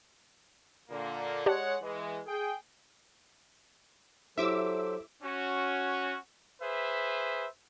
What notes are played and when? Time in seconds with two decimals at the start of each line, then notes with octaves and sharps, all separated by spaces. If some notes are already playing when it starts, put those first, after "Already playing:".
0.90 A#2 D3 A#3
1.46 G#3 G4 C#5 D5 F#5 A5
1.81 E3 G#3
2.26 G#4 G5
4.38 F#3 E4 G4 A4 C5 E5 D6 E6
5.23 C#4 F#4
6.61 G#4 B4 C5 E5